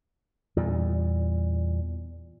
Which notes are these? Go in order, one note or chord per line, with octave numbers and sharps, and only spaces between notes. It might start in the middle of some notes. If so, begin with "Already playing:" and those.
E2 A#2 G3